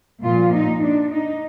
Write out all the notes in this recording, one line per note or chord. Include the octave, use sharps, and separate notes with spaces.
A#2 F3 F4
D#4
D4
D#4